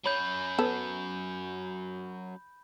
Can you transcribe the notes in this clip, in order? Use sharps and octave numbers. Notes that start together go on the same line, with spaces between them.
F#3 C#4 C#5 B5 G6
B3 A4